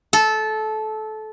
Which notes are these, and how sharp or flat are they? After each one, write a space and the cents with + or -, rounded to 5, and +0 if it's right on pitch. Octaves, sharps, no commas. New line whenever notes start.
A4 -20